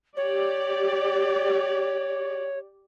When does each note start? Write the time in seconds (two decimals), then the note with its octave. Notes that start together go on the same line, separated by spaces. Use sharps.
0.17 G4 C#5 D5